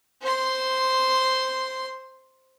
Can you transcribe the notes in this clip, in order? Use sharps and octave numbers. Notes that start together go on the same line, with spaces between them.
C5 C6